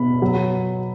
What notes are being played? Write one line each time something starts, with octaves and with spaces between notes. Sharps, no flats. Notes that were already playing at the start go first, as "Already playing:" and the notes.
Already playing: B2 B5
F#3